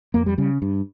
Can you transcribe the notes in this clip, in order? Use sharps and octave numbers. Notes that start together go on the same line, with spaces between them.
F2 A#3
G3
C#3 G3
G2